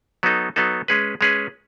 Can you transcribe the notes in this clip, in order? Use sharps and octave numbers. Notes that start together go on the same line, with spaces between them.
F#3 B3 D#4 A4
F#3 B3 D#4 A4
G#3 C#4 G#4 B4
G#3 C#4 G#4 B4